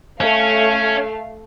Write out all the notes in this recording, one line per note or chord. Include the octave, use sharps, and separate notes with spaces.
A3 C#4 F5